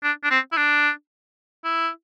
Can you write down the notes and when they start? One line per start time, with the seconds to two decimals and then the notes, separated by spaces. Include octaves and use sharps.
0.03 D4
0.23 D4
0.31 C4
0.52 E4
0.57 D4
1.64 E4